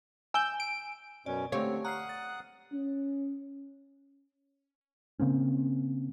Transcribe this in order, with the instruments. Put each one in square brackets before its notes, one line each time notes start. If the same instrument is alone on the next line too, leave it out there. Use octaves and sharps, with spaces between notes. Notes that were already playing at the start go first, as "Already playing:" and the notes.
[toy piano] G#5 [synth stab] E6 G6
[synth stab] D7
[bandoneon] F#2 B2 C#4 [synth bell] D5
[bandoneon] D3 C4 [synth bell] A3 G4 F5 [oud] C#5
[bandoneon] F#5 D#6 F#6 [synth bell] A#5 F6 C7
[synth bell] A6
[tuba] C#4
[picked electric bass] C#3 A#3 C4 C#4